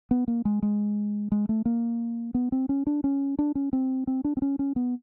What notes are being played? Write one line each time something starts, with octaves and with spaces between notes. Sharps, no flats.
B3
A#3
G#3
G#3
G#3
A3
A#3
B3
C4
C#4
D4
C#4
D4
C#4
C4
C4
D4
C4
C#4
C#4
B3